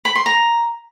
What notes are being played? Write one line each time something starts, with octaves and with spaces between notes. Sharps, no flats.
B5
C6
A#5